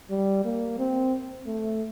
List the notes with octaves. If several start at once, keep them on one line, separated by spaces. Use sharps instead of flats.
G3
A#3
C4
A3